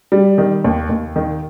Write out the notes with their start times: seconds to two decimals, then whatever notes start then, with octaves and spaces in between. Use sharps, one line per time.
0.12 G3
0.38 D#3
0.64 D#2
0.89 D#2
1.16 D#3